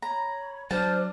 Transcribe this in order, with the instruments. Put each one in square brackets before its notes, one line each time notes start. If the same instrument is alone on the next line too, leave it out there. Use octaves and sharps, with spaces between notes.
[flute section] C#5 B5 [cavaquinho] A#5
[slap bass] F#3 [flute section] D4 F6 [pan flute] C5 [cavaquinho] A5